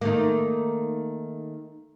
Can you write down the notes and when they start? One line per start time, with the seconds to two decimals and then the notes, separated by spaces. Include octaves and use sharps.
0.01 D#3 A3 A#3